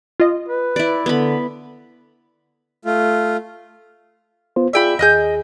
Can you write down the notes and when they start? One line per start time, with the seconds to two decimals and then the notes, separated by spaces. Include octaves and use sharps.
0.20 F4 D#5
0.49 B4
0.76 E4 D5
1.06 D3 B3 B5
2.85 A3 F4
4.56 B3 F4 C5
4.73 F4 G#4 D5 E5 G5 B5
4.99 D#2 G#4 D#5 F#6 G6